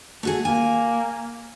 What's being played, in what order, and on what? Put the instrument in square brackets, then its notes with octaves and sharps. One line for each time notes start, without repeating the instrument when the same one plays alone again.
[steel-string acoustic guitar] A3 F#4 G#4
[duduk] A#3 [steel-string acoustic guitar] G#5